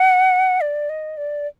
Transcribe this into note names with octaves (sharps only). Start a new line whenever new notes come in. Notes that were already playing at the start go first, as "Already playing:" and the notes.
Already playing: F#5
D5
D#5
D5